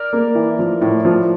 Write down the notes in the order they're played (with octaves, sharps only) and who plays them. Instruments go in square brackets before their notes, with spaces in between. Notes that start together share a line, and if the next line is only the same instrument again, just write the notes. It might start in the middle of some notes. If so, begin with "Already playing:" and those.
Already playing: [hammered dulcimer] A#4 D5
[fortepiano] A#3
E3
F3
A2
F3